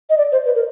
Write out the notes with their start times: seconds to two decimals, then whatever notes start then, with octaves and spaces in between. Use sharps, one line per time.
0.10 D#5
0.18 D5
0.32 C5
0.46 B4
0.55 A#4